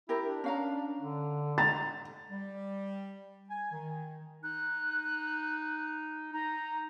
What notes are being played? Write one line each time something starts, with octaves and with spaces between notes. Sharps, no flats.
E4 G4 A#4
D4
C#4 F5 A#5
D3
A#5 A6
G3
G#5
D#3
D#4 F#6
D#4 A#5